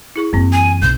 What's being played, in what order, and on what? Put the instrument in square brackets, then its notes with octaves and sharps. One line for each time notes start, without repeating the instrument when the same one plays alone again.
[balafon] E4 G#4 C#6
[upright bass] F#2 E3 [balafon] A#3 C4
[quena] G#5
[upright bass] B1 [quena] G6